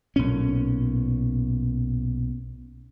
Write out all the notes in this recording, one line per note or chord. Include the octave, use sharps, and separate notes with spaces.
B1 A#2 C#4